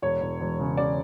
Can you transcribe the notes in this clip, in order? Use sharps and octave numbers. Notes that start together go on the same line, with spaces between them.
E1 C#5
E1
E1
C#3
C#3 D5